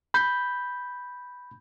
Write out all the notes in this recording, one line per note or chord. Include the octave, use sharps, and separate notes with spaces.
B5 G6